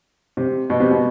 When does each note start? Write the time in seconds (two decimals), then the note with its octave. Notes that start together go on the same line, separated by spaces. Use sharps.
0.37 C3
0.70 B2
0.80 C3
0.91 B2